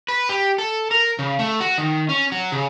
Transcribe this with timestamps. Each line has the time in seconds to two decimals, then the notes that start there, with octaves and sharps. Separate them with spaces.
0.08 B4
0.29 G4
0.58 A4
0.91 A#4
1.19 C#3
1.39 A3
1.60 F#4
1.78 D#3
2.09 C#4
2.32 F#3
2.52 C#3